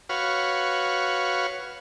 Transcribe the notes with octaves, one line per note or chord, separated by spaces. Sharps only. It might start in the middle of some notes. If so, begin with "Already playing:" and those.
F#4 B4 C#5 F5